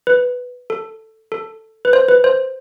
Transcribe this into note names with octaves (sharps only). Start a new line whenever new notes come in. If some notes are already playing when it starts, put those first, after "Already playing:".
B4
A4
A4
B4
C5
B4
C5